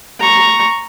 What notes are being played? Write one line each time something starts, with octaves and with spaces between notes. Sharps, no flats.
A#5 C#6